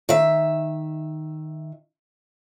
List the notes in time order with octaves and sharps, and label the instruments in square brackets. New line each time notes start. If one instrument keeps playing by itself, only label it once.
[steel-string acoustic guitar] D#3 E5